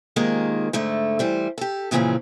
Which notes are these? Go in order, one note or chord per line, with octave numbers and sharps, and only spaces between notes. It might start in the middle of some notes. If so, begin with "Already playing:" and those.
C3 D#3 G#3 A#3 F4
G#2 D3 A3
E3 G3 C5
G4 A4
F2 A#2 C#3 E3 C4 C#4